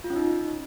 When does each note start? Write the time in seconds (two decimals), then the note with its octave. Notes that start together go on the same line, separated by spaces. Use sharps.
0.04 F4
0.10 C#4
0.16 D#4